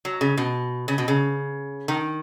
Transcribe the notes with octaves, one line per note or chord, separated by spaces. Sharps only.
F#3
C#3
B2
C#3
B2
C#3
D#3